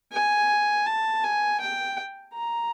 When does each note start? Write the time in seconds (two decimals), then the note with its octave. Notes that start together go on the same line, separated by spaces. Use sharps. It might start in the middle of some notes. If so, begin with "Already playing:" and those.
0.13 G#5
0.86 A5
1.24 G#5
1.61 G5
2.34 A#5